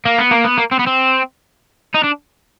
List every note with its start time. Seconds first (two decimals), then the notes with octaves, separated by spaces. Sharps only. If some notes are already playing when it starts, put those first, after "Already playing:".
0.06 A#3
0.19 B3
0.31 A#3
0.44 B3
0.58 A#3
0.71 C4
0.79 B3
0.86 C4
1.94 D#4
2.03 D4